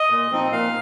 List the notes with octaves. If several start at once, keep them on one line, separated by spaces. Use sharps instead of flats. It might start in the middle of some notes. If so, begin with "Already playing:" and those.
Already playing: D#5
A#2
F3 C4 D#4
A#2 F5